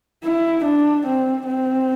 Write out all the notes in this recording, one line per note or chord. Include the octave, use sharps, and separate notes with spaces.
E4
D4
C4
C4